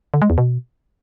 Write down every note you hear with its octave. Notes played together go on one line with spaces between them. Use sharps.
D3
G#3
E2
B2